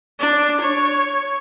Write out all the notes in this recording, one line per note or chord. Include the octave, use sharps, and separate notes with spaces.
D4
C#5